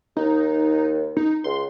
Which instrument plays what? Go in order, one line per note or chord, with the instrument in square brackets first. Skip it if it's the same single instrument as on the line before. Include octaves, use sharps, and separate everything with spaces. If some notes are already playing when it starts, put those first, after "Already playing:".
[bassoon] D#2 [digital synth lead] D#4
[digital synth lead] D#4
[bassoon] C#2 [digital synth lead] C6